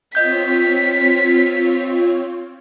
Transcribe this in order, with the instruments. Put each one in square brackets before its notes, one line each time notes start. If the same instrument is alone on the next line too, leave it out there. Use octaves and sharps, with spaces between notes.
[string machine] C4 F4 C#5 [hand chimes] D#5 G6 [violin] B6